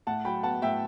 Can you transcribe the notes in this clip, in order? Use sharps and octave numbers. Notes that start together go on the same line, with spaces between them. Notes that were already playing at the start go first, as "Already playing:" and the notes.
A2 F#5 A5
F#3 G5 B5
B3 F#5 A5
A2 E5 G5